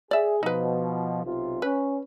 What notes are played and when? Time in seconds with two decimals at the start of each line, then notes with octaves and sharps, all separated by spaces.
0.11 G#4 D5 E5
0.43 B2 F3 D#4 B4
1.24 B1 C3 F4
1.62 C#4 B4